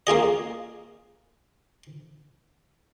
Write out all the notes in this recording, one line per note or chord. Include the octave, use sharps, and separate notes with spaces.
A#3 F4 G#4 D#5